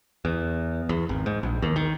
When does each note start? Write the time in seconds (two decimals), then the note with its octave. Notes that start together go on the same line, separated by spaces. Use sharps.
0.25 E2
0.89 E2
1.09 G#1
1.26 G#2
1.43 A#1
1.62 D#2
1.76 D#3